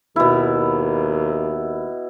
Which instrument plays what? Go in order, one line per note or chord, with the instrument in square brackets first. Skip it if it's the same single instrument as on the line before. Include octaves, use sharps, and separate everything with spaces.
[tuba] D#2 [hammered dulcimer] B2 E4